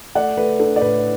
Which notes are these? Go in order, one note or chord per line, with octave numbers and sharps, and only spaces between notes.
A3 D5 F#5
A3 B4
D4 A4
D5
A2 B4